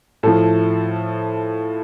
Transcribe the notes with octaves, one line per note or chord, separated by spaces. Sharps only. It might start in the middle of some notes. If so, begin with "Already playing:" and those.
A2 F3 A4